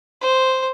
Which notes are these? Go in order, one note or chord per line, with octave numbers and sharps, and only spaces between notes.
C5